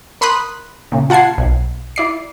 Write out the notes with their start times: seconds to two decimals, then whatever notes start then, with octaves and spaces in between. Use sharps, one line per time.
0.21 A#4 B5 C6 D#6 F#6
0.92 A#2 C#3
1.10 F4 F#5 A5 G#6 C7
1.38 B1
1.96 E4 D5 C7